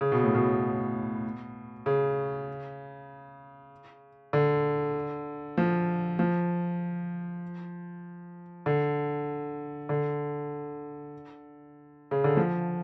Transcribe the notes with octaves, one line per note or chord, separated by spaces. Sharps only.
C#3
B2
A2
B2
C#3
D3
F3
F3
D3
D3
C#3
D3
F3